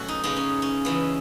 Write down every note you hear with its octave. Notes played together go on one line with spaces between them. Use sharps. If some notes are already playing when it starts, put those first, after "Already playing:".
Already playing: B2 F#3 A3 C#4 F#4 A4
D#4
C#3 G#3 B3 D#4
C#4
C#4
C#3 E3 B3